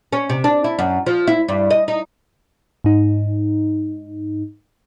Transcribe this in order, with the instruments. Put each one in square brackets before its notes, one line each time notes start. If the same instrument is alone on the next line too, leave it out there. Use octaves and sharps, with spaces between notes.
[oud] C#4
C3
D4
E4
F#2
F3
E4
G2
D#5
D#4
[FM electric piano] G#2 D#4